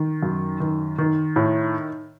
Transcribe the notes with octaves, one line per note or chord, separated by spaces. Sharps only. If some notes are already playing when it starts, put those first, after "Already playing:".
Already playing: D#3
F#2
D#3
D#3
A2